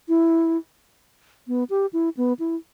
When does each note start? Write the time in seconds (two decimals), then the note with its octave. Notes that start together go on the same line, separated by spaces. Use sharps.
0.09 E4
1.48 B3
1.70 G4
1.93 E4
2.17 B3
2.39 E4